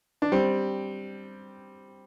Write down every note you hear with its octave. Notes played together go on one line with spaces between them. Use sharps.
D4
G3 C4